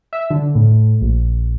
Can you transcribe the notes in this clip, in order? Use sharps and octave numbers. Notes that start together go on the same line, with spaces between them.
E5
D3
A2
A#1